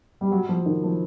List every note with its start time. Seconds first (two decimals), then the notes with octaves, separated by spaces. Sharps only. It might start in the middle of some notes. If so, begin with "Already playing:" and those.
0.21 G3
0.32 F#3
0.49 F3
0.66 D#3
0.84 F3